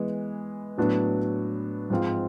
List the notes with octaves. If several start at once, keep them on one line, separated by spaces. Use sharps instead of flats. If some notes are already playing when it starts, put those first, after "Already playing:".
Already playing: E3 G#3 B3
A2 F#3 B3 D4 F#4
G#2 F3 G#3 C4 F4